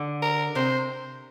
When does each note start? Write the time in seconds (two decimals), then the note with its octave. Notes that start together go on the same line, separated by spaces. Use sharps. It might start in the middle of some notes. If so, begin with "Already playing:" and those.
Already playing: D3
0.22 A#4
0.55 C3 C5